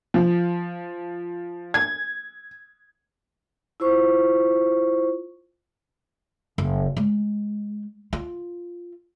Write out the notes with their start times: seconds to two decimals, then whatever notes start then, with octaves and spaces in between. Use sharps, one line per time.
0.14 F3
1.74 G#6
3.80 E4 F4 C5 C#6
6.58 F#1
6.97 G#3
8.13 F4